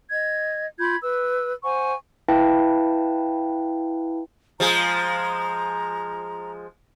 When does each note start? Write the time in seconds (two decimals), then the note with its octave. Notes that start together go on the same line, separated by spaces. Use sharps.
0.10 D#5 G#6
0.79 F4 B5 G6 G#6
1.02 B4 E6
1.63 C5 F#5 G#5 C#6
2.28 E4 B4 F5 G5 A5
4.60 F3 G#3 G#4 A#5